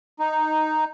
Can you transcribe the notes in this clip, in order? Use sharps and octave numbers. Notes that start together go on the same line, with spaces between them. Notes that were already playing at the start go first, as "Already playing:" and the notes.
D#4